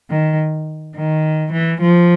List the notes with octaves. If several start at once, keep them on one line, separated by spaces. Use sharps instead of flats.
D#3
D#3
E3
F3